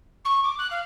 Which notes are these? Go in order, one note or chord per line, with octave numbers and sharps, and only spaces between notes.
C#6
D6
F#6
F5